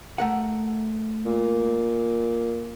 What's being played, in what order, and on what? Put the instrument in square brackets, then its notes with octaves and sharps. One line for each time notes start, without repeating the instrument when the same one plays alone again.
[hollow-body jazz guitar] A3 A#4 F#5
[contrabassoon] A#2